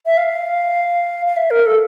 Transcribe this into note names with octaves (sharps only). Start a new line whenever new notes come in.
E5
F5
F5
E5
A#4
A4